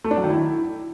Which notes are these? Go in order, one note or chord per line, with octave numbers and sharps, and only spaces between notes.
A3
D4
F#3
D#3
E4